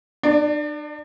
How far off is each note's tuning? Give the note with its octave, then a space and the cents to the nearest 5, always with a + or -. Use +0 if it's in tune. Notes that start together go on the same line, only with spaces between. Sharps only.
D4 +40 D5 +0